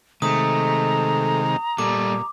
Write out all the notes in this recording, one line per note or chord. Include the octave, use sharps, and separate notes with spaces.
C3 D#3 G#3 A3 A#5 D#6
A#2 G3 A4 D6